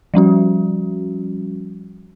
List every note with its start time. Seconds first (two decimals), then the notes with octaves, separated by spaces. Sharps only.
0.14 F3 G3 C#4 F#4